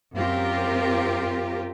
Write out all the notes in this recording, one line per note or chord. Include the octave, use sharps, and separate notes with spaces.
F#2 C4 F4 G4 A#4